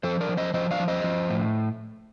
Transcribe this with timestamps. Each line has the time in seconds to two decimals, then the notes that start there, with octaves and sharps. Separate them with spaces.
0.03 F3 A4 C5
0.21 A#4 D5
0.29 F3
0.37 C5 D#5
0.54 F3 C5 D#5
0.71 D5 F5
0.80 F3
0.88 C5 D#5
1.04 F3
1.30 A2